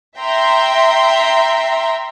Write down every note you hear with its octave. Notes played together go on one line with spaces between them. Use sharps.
E5 G5 A#5 C6